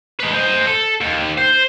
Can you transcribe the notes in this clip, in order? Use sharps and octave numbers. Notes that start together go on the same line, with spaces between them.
G#3 B4
C5 D#5
A4
D#2
C5